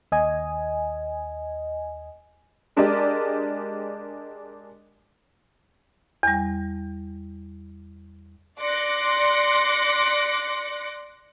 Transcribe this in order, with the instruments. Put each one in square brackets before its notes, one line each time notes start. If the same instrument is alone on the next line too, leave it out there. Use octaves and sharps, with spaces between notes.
[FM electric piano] D#2 D#5 G#5
[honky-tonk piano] G#3 D4 G4 A#4 D5 D#5
[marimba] E2 G3
[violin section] D5 C6 D6 F#6 A#6 C#7